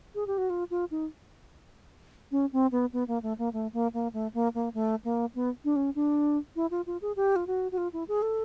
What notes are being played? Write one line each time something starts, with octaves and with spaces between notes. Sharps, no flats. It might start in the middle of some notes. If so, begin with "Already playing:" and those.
G#4
G4
F#4
F4
F4
D#4
C#4
C4
B3
B3
A#3
A3
A#3
A3
A#3
A#3
A3
A#3
A#3
A3
A#3
B3
D4
C#4
D4
E4
F4
F4
G#4
G4
F4
F#4
F#4
F4
E4
G#4
A4